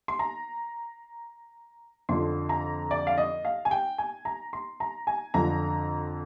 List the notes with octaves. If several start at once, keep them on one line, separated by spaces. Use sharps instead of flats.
C6
A#5
F2 D3 F3 C6
A#5
D5
F5
D#5
F5
G#5
G5
G#5
A#5
C6
A#5
G#5
F2 D3 F3 A#5